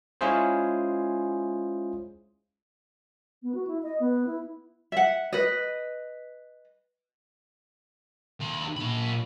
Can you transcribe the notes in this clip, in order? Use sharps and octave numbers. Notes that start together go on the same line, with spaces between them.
G#3 C#4 E4 F4 G#4 C5
B3
F#4
E4
D#5
B3
E4
E5 F#5
B4 D#5
D#2 B5
A#2 B5